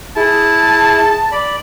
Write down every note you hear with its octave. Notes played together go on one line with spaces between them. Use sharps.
E4 G#4 A5
D5 B5